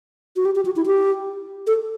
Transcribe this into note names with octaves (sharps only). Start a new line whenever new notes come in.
F#4
G4
G4
F#4
E4
G4
A4